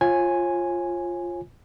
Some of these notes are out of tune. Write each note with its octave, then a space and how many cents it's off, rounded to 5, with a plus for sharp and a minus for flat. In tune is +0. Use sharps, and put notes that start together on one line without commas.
F4 +0 C#5 -40 G#5 +0